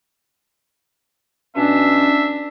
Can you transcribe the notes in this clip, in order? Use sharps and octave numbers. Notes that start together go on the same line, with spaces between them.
B2 C#4 D4 E5